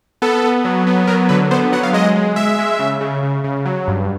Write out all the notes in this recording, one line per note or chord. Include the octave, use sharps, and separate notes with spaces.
B3 A4
B3
F#3
B3
F#3 A#4
D3 B4
B3 C5
F#3 F#5
F5
G#3 D#5
G#3
G#3 E5
G#3
C#3
C#3
C#3
C#3
F#3
G2